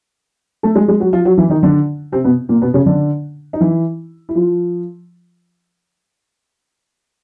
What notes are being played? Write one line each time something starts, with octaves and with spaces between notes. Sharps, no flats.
A3 A4
G#3 G#4
G#3 G#4
F#3 F#4
F3 F4
F#3 F#4
E3 E4
D#3 D#4
D3 D4
C3 C4
B2 B3
A#2 A#3
B2 B3
C#3 C#4
D3 D4
D#4
E3 E4
E4
F3 F4